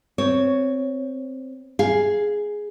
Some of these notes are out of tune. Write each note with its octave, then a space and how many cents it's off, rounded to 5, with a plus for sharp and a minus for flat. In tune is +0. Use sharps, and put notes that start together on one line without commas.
C4 +0 C#5 +10
G#4 +0 F5 +0